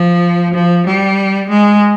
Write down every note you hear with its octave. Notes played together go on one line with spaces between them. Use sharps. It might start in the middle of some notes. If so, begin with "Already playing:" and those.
Already playing: F3
F3
G3
G#3